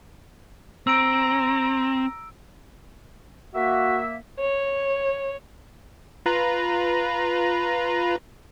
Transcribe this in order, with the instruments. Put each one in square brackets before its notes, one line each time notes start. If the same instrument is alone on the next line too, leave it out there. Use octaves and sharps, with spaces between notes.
[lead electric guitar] C4 [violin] A#5 [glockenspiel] E6 D7
[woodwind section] A#3 E5 [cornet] F#4
[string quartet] C#5
[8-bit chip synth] F4 B4 A#5